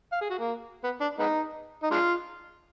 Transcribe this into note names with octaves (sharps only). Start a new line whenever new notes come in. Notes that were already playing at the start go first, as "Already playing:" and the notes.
F5
G#4
F#4
A#3
B3
D4
G#3 B3 D#4
D#4
G#3 D4 F4